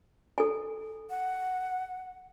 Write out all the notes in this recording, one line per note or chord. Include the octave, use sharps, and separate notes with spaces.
A4 G#5
F#5